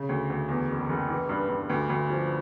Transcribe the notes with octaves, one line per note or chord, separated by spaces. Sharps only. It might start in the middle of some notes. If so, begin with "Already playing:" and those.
Already playing: C#3
D2
D2
E2
F#1
F#1
E3
G2
G2
D2
D2
F3